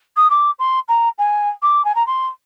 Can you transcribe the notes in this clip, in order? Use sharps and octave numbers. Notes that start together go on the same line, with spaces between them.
D#6
D6
C6
A#5
G#5
D6
G#5
A#5
C6